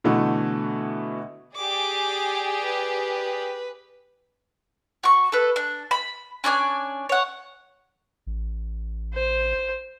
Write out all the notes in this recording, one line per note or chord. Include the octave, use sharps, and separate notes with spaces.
B2 D3 E3 A3 F#4
G4 G#4 D5 D6
B4
F#4 C#6
A4 B4
D4
B5
C#4 D4 D5 G#5
C#5 F#5
A1
C5